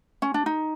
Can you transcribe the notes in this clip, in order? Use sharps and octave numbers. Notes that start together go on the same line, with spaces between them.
C#4
D4
D#4